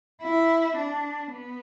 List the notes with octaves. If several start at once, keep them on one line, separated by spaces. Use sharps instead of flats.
E4
D4
B3